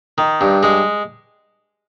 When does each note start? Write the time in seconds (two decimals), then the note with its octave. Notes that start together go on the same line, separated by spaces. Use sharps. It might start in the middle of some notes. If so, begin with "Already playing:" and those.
0.18 D#3
0.41 G2
0.63 G#3